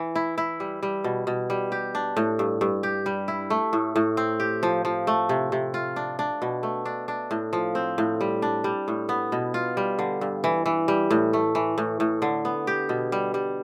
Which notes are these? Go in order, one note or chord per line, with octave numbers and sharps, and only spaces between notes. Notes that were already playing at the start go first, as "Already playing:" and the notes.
Already playing: E3
E4
E4
G3
G3
B2
B2
G3
G4
D4
A2
G2
G2
G4
G3
E4
A3
A2
A2
C4
G4
F3
F3
A3
C3
C3
F4
D4
D4
B2
A3
D4
D4
A2
F3
C4
A2
G3
D4
G3
A2
B3
B2
F4
G3
D3
G2
E3
E3
G3
A2
A3
E3
A2
A2
D3
B3
G4
B2
G3
G3